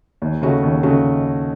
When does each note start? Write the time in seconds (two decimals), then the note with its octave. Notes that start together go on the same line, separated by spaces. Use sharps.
0.22 D#2
0.42 C#3 A3 C#4 F#4
0.63 D#2
0.83 C#3 A3 C#4 F#4